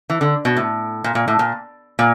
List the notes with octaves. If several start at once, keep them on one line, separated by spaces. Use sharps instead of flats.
E3
D3
B2
A2
A#2
A#2
A2
A#2
A#2